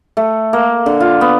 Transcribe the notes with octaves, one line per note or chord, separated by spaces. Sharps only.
A3
A#3
D3
F4
B3